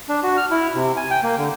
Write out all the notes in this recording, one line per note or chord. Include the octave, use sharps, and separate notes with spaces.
D4
F#4
F6
E4
C3
G#5
G5
A#3
D3